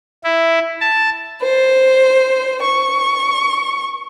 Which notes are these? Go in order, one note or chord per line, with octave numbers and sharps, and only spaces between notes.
E4
A5
C5
C#6